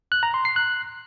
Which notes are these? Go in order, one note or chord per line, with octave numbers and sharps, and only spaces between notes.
F#6
A#5
C6
C7
F#6